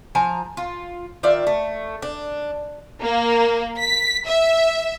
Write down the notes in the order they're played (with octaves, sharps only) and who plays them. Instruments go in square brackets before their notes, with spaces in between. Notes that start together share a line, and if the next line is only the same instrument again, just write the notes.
[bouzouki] F3 G#5 A#5
F4
D#3 F4 D5 E5
A3
D4
[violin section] A#3
B6
E5